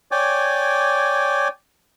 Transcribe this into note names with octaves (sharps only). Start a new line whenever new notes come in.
C#5 D5 G5 G#5 D6